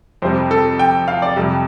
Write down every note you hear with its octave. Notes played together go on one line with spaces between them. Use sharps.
F2 C3 G3 C5
A4
G5
F5
D5
F2 C3 G3